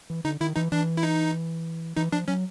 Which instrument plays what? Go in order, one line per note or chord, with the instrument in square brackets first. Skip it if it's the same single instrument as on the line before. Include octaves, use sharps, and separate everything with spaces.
[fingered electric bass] E3
[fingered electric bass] D3 [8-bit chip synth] D#4
[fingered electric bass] D#3 [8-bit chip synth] E4
[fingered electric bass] E3 [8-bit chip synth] D#4
[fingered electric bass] E3 [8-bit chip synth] D4
[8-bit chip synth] E4
D#4
[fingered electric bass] E3 [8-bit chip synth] D#4
[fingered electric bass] F3 [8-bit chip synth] D4
[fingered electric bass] F#3 [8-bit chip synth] C#4